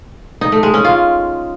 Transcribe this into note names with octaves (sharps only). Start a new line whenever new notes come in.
D#4
A3
G#3
C#4
F4